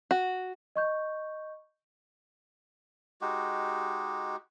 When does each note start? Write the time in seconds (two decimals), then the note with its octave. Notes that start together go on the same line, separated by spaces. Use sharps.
0.11 F#4
0.76 D#5 C#6 G6
3.21 G#3 D#4 F#4 G4